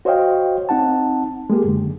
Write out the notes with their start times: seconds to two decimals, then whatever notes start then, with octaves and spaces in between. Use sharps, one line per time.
0.05 F#4 C5 C#5 D#5 F5 G5
0.69 C4 D#4 F#5 A5
1.50 G#3 A#3 G4 G#4
1.64 F#2 D3